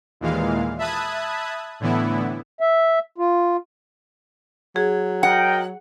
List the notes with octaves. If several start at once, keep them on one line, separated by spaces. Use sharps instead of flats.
D#2 A#2 E3 G#3 F5
E5 A5 B5 D#6 F#6 G#6
A2 D3 E3 B3 E4
E5
F4
F#3 G#4
A#4 D#5 F#5 G5